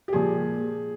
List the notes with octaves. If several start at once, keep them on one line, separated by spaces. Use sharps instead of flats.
G4
A#2 F3 G#3 G#4